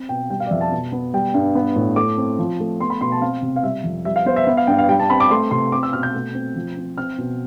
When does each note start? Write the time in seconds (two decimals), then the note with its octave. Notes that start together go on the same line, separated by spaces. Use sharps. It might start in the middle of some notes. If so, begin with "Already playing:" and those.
Already playing: C4
0.09 B2 G5
0.30 G3 G5
0.40 F5
0.46 D5
0.51 F2 E5
0.61 A5
0.72 B2
0.92 B3
1.14 G3 G5
1.34 G2
1.55 B3
1.76 A2
1.96 A3 D6
2.17 C4
2.39 F3
2.60 A3
2.81 B3 C6
2.90 B5
3.01 B2 C6
3.12 A5
3.21 C4 F5
3.42 C3
3.56 F5
3.63 G3 E5
3.84 F2
4.05 G3 E5
4.16 F5
4.26 B3 C5
4.36 E5
4.47 B3 E5
4.57 F5
4.67 G2 G5
4.78 F5
4.89 G3 G5
5.00 A5
5.10 C4 B5
5.20 D6
5.31 A3 C6
5.51 C3 C6
5.72 C4 D6
5.83 E6
5.93 B2 F6
6.03 G6
6.14 A3
6.34 C4
6.56 F3
6.77 C4
6.97 C4 F6
7.18 B2